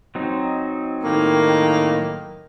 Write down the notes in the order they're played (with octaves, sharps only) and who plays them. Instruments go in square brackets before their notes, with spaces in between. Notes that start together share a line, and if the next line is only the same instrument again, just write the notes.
[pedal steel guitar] F#3 C4 D#4
[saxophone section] A2 D#3 A#3